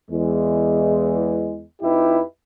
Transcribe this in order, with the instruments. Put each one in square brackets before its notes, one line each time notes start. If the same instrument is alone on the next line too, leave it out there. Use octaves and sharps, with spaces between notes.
[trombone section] E2 G#3
F2 D#4 E4 G4 B4